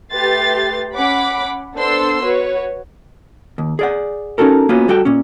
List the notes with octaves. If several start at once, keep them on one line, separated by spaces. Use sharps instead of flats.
A3 G4 B4 C6 A6
C#4 F#5 B5 D6 B6
B3 D4 A4 C5 C6 E6
F#4 B4 C#5
D#2
G#4 D5 F#5
C#4 D#4 F#4 A4 A#4
A#3 B3 C#4 F4 F#4
G3 F#4 A4 G5
A#2 C#4